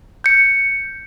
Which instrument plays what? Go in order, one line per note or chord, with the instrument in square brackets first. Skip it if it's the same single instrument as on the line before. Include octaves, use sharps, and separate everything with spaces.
[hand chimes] G6 C#7